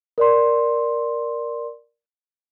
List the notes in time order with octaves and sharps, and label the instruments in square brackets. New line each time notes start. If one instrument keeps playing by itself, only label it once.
[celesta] A#4 D5 C6